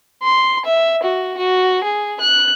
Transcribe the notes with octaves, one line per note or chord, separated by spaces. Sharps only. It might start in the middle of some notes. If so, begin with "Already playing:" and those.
C6
E5
F#4
F#4
G#4
F#6